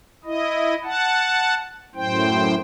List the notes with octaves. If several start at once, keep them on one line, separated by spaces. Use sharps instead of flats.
E4 D#5
F#5 A5
F#2 A2 C5 G5